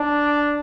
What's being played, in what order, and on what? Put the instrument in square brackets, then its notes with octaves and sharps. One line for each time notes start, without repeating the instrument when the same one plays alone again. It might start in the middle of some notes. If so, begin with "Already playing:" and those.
Already playing: [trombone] D4